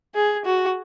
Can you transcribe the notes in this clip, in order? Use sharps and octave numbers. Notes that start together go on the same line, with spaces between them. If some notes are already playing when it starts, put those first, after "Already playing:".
G#4
F#4